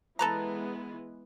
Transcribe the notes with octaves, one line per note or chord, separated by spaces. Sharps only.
E3 G#3 B3 A4 B4 A#5